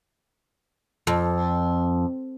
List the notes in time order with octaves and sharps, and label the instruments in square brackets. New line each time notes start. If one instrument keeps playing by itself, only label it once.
[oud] F2